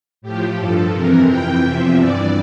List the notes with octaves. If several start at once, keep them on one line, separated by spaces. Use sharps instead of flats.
A2 F3 G4
G2 F3 A4
F2 C3 E3 A#4
F2 E3 G5
E2 C3 F3 E5
G2 E3 D5